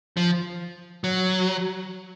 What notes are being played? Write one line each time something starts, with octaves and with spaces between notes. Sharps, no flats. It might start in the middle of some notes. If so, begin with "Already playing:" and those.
F3
F#3